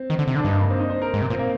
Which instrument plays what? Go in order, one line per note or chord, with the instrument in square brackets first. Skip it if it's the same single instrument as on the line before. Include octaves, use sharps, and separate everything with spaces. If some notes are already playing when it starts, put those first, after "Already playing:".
Already playing: [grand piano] C4
[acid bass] D#3
D3
C3
D3
[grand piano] D4
[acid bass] G2 [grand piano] D#4
[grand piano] A#3
D4
C4
D#4
C5
A#4
[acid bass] G#2
C3
[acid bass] A#2 [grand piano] C4
[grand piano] A#3